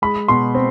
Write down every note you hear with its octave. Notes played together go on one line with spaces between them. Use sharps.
G#3 B5
B2 C6
C4